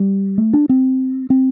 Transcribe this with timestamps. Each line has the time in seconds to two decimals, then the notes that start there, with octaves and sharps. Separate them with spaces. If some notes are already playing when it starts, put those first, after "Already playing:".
Already playing: G3
0.38 A3
0.53 D4
0.69 C4
1.30 C4